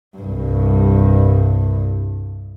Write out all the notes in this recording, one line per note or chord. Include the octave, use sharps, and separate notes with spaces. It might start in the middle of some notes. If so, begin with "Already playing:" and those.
C2 G2